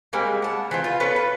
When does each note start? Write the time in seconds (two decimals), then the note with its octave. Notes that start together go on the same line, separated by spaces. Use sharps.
0.13 G3 G#3 A#3 C4
0.42 F#5 A5
0.71 E3 C4 F4
0.84 F4 B4
1.00 B3 C#4 A4 B4
1.16 B4